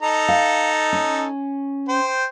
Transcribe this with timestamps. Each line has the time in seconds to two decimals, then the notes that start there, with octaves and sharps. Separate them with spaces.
0.02 D#4 A4 A#5
0.28 F5
0.93 C#4
1.89 C5 G5